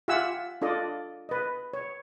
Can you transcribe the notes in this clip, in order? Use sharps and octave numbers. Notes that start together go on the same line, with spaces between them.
F4 G4 E5 F#5 G#5 E6
D4 F4 A4 D5 D#5
B4 D#5
C#5